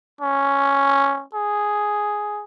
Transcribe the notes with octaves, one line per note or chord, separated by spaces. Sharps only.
C#4
G#4